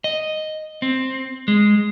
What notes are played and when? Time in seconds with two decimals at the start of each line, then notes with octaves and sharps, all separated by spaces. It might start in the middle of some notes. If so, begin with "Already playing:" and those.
0.04 D#5
0.82 C4
1.48 G#3